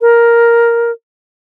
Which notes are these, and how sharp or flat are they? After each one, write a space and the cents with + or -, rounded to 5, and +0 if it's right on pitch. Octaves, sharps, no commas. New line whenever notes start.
A#4 +5